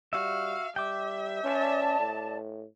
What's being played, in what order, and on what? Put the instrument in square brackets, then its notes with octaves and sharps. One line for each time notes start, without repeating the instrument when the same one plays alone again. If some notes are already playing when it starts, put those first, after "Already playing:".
[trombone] G3 [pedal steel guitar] F#4 E5 [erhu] F5
[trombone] G3 [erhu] E5 [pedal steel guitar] G5 D6
[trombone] C#4 [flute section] D5 A5
[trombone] A2